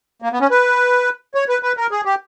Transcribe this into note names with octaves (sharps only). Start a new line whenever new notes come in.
A#3
B3
C#4
B4
C#5
B4
B4
A#4
G#4
G4